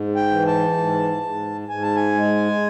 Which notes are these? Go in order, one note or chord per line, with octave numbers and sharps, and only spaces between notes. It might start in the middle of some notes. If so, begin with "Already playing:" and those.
Already playing: G#2
G5
E3
A5
G#2
G#2
G#2 G#5
A5
G#5
G#3